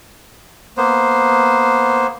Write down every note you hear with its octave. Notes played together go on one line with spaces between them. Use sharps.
A#3 B3 C5